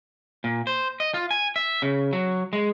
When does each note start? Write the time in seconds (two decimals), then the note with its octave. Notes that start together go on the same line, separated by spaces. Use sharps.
0.44 A#2
0.67 C5
1.00 D#5
1.14 F4
1.31 G#5
1.56 E5
1.82 C#3
2.13 F#3
2.53 G#3